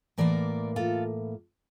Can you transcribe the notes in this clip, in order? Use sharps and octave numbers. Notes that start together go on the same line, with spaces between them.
A2 E3 A#3 A#4 D5
F4 A4